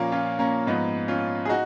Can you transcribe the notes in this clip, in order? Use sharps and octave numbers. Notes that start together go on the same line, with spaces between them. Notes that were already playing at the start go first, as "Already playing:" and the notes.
Already playing: A#2 F3 A#3 C#4
C#4 F4
A#3 C#4
G#2 F3 B3 D#4
C#4 F4
G#4
D#4 F#4